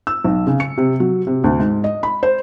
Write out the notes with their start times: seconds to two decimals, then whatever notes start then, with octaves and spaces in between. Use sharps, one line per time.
0.07 E6
0.24 B1
0.47 C#3
0.60 C#7
0.78 C3
1.00 F#3
1.27 C3
1.44 D2
1.60 G#2
1.84 D#5
2.03 B5
2.23 C5